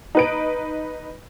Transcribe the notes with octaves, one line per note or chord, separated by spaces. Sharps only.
D#4 B4 D7